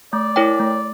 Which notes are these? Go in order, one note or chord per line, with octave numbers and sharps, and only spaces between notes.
A3 D5
E4 A#4 C#5 G5
A3